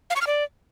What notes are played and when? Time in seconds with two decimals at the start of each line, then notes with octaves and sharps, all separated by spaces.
0.10 F5
0.16 C#6
0.21 F6
0.27 D5